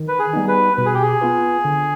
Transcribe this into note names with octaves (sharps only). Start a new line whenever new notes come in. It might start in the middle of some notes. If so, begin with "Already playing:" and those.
Already playing: D#3
B4
G#4
G3 B3 D#4
B4
B2 B4
G#4
G4
G#4
B3 F4 B4
D3